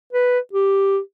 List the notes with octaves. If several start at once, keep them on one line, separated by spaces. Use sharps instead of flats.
B4
G4